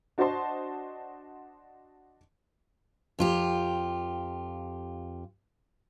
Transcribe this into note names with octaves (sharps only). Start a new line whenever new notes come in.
D4 F#4 C5 D#5 A5 C6
F2 F4 G4